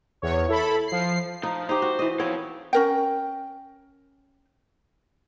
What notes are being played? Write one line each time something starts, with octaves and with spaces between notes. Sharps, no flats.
E2 C#5
E4 A4 B5
F3 C7
F3 D#4
D#4 G4 C5
F#4
E3 D#5
F3 B3 C4 C#5
C#4 A#4 G5